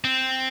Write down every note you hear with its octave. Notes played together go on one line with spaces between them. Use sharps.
C4